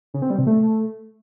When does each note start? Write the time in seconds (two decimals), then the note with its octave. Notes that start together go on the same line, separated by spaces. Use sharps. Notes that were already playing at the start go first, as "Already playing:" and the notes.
0.14 C#3
0.22 C4
0.30 G3
0.38 C3
0.47 A3